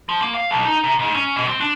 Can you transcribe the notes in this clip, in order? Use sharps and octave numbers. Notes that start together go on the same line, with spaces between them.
F3
A#3
F5
B1
D#4
C3
G#2
C#4
B2
C4
D4